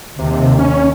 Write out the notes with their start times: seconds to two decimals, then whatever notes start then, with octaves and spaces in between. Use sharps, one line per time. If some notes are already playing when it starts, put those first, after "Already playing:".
0.19 D#2 C3
0.59 C#4